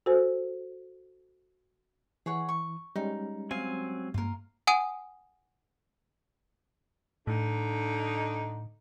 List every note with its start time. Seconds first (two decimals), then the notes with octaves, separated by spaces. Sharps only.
0.06 F#4 A4 A#4 C5 G#5
2.26 E3 G#4 C#5 F#5
2.49 C#6
2.96 G3 G#3 C#4 D#4
3.51 F#3 C4 F5 G#5
4.14 G2 A#3 F4 A#4
4.67 F#5 G#5 D#6 D#7
7.27 A2 D3 D#4